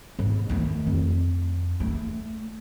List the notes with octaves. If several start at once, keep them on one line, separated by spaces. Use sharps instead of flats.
G#2
D#3 A3
F2
A3